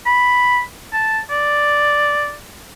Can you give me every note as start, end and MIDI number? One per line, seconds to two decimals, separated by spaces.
0.06 0.60 83
0.93 1.19 81
1.30 2.34 74